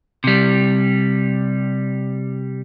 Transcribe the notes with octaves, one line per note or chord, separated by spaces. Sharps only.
C3 G3